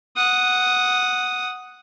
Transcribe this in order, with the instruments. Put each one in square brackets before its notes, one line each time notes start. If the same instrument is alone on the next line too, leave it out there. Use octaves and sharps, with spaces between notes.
[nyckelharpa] F#5 D#6